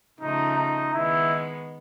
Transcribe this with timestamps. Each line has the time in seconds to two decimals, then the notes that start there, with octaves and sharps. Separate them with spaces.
0.20 C#3 F3 A3 D#4
0.58 D#4
0.94 D#3 G#3 B3 E4